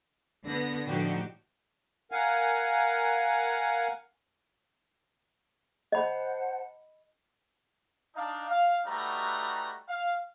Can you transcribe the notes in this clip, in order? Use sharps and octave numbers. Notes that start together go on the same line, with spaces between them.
D3 B3 A#6
A2 D3 F3 D#4 F#4 G4
A#4 F5 F#5 G#5
C5 D#5 F#5 A5 B5
D4 D#4 F5
F5
G3 A3 D#4 F#4 B4 A#5
F5